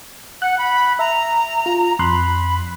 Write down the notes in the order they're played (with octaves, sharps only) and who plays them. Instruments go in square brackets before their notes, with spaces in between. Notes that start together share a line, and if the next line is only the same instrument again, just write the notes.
[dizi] F#5 [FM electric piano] F#6
[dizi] B5
[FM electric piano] E5 [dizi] A#5
[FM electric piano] F4
[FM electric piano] F2 C6 F#6 [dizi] B5